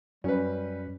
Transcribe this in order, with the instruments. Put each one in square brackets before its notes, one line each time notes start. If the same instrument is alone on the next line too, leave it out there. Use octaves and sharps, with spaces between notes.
[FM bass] F#2 [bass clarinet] G3 [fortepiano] C#4 B4